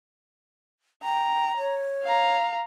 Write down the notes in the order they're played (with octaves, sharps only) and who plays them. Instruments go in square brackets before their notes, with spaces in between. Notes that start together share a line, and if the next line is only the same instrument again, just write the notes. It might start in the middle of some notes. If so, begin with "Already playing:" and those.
[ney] G5 [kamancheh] A#5
[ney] C#5
[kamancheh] F5 A#5